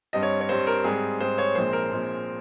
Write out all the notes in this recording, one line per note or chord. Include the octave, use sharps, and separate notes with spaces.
G2 G3 C4 D#5
C#5
C#5
G2 G3 C4 C5
A#4
G#2 G3 C4 G#4
G#2 G3 C4 C5
C#5
A#1 A#2 F3 G#3 C4 C5
A#4
A#1 A#2 F3 G#3 C4